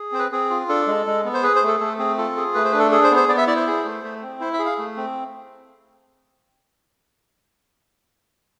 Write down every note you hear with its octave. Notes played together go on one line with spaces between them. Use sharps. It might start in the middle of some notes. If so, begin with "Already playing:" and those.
Already playing: G#4
C4 C5
B4
C4 G#4
F4
D4 A4
G#3
G#3
B3
C5
G#4 B4
C5
A3
A4
A3 A4
C4 G#4
F4 A4
G#4
A3 B4
C5
D4 B4
A4
G#4 A4
C5
B3
C5
B3 D5
E5
E4 D5
C5
G#4
A3
A3
C4
E4 C5
E5
G#4
F5
A3
C4